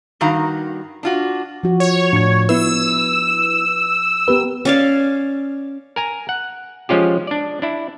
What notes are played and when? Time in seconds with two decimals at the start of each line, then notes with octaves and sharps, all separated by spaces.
0.21 G2 D#3 F#4 F5 A#5
1.03 D4 F4 F#4
1.63 F3 F#4
1.80 C#5
2.13 A2 D4 G#6
2.49 B3 E4 B4 E6
4.28 B3 G4 A#4 B4
4.65 C#4 D5 F5
5.96 A#4 G#5 A#5
6.29 F#5
6.89 F3 G#3 C#4 F4 G4
7.27 D4 D5
7.62 D4 E4